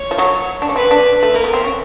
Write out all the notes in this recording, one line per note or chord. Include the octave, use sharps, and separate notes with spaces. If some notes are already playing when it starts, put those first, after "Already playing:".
Already playing: C#5
F3
F#3
D4
C#4
C4 B4
D4
A3
A#3 A#4
B3
C4
C#4